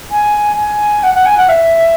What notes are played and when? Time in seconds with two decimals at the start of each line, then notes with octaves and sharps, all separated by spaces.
0.11 G#5
0.57 G#5
1.03 F#5
1.14 F#5
1.26 G#5
1.37 F#5
1.49 E5